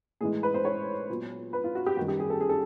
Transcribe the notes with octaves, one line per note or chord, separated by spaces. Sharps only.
A2 E3 G#3 G#4
B4
C5
C#5
A#2 F#3 B3
B4
F4
F#4
G4
F#2 D#3 G3 F#4
G4
G#4
A4
G#4
A4